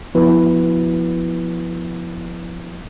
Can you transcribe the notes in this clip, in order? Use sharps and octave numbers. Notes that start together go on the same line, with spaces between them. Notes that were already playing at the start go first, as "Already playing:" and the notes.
F3 B3 E4 F#4 B4